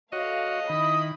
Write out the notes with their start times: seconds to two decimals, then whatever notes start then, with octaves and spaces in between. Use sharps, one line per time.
0.13 A3 F#4 C#5 D#5 F5
0.70 D#3 E4 B5 D#6